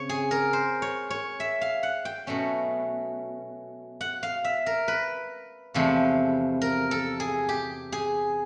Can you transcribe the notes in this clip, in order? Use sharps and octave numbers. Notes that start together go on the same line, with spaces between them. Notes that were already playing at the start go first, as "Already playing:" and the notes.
Already playing: C#3 C4 C#5
G#4
A#4
C5
C#5
C#5
E5
F5
F#5
G5
B2 F#3 A3 C#4
F#5
F5
E5
A#4
B4
E2 C3 F3 A3
A#4
A4
G#4
G4
G#4